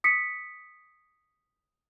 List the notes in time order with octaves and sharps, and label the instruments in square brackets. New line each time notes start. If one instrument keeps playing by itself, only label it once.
[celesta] D#6 B6 C#7